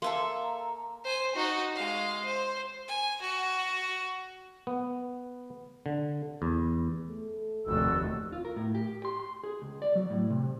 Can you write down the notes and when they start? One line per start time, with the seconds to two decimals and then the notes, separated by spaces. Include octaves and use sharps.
0.02 A#3 A4 E5 C6
0.41 A#5
1.04 C5 G#5
1.35 D#4 F#4
1.75 G#3 F5
2.25 C5
2.88 G#5
3.22 F#4
4.67 B3
5.86 D3
6.42 E2
7.09 A3
7.67 F1 D#2 F#4 D5 E6
8.32 F4
8.45 A#4
8.56 A2
8.75 G4
9.05 C6
9.20 C6
9.44 G#4
9.62 C#2
9.82 D5
9.95 F#3
10.10 A2
10.30 C3